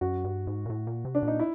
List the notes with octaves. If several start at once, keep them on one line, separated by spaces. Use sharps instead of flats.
F#2 F#4
G2
G#2
A#2
A2
A#2
C3
D4
A#2 D#4
E4